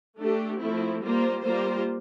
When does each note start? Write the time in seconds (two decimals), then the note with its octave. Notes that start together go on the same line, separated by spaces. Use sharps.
0.18 A3 D4 G4
0.60 F3 A3 C4 E4
1.02 G3 A#3 F4 C5
1.43 G3 A#3 F4 C5